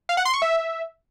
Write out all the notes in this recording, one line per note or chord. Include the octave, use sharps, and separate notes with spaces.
F5
F#5
C6
C#6
E5